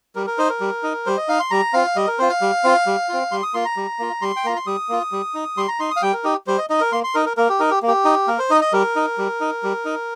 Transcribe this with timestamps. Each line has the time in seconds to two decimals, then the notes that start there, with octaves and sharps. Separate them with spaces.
0.15 G3 A#4
0.27 A#4
0.38 D#4 C5
0.50 A#4
0.61 G3
0.83 D#4
1.06 G3 C5
1.17 D#5
1.29 D#4 F5
1.40 C6
1.51 G3 A#5
1.73 C4 F4 F5
1.96 G3 D#5
2.07 A#4
2.19 C4 F4 C5
2.30 F5
2.41 G3
2.64 C4 F4
2.86 G3
3.09 C4 F4
3.31 G3 C6
3.43 D#6
3.54 A#3 F4 C6
3.65 A#5
3.77 G3
3.99 A#3 F4
4.22 G3 C6
4.36 G5
4.44 A#3 F4 A#5
4.56 C6
4.66 G3 D#6
4.89 A#3 F4
5.12 G3
5.34 D#4
5.57 G3 C6
5.68 A#5
5.80 D#4 C6
5.91 D#6
5.96 F5
6.02 G3 G5
6.13 A#4
6.24 D#4 G4
6.47 G3 C5
6.58 D#5
6.70 D#4 D#5
6.81 A#4
6.92 A#3 C6
7.04 C6
7.15 D#4 A#4
7.26 A#4
7.37 A#3 A#4
7.49 G4
7.60 D#4 A#4
7.71 G4
7.83 A#3
7.88 G4
8.05 D#4
8.27 A#3 A#4
8.39 C5
8.50 D#4 D#5
8.61 D#5
8.73 G3 A#4
8.96 D#4
9.18 G3
9.41 D#4
9.63 G3
9.85 D#4